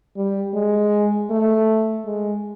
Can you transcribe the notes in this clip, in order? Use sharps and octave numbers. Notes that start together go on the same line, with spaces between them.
G3
G#3
A3
G#3